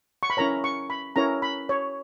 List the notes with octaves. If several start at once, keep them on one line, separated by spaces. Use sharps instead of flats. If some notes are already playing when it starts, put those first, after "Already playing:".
C#6
B5
C#4 E4 A#4 C#5 A#5
C#6
B5
C#4 E4 A#4 C#5 A#5
B5
C#5